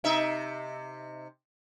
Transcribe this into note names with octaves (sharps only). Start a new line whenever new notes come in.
C3 D#4 E5